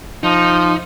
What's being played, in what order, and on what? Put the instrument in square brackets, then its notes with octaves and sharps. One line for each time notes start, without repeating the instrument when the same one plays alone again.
[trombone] F3 [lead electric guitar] D#4